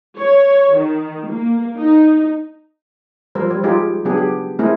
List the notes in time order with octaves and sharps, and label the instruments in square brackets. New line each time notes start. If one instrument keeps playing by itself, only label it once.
[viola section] C#5
D#3
A#3
D#4
[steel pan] F3 G3 A#4 C5
G3
G3 G#3 D#4 F4 G4 G#4
C#3 F#3 B3 D4 G4 G#4
G4
G#3 A3 C4 E4 G#4 A#4